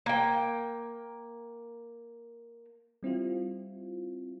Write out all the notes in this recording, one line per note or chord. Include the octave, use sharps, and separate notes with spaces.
A#3 G5
G3 C4 E4 F4